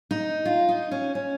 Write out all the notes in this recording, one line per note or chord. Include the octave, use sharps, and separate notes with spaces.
D#4
F4
D#4
C#4
C#4